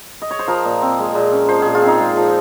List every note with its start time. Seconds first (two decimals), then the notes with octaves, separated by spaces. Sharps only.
0.22 D#5
0.31 C#5
0.39 C5
0.48 F3 A#4
0.65 A#2
0.82 C4
0.99 G#3
1.15 A#2
1.32 C#4
1.49 F3 C5
1.62 A#2 G#4
1.75 F4
1.82 C4 D#4
2.00 G#3
2.17 F3